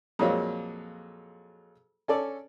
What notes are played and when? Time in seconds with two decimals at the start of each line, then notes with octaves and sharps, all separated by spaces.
0.19 F2 A#2 F#3 G#3 A#3
2.08 C#4 A4 D5